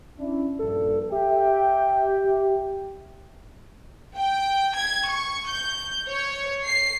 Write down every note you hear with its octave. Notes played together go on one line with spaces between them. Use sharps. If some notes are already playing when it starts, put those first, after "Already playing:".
C#4 D4 E4
A#1 G2 A4
G4 E5 G5
G5
G#6
C#6
G6
C#5
C7